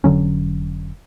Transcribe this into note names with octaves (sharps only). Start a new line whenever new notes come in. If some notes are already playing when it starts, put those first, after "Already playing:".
F1 D3 F#3 C#4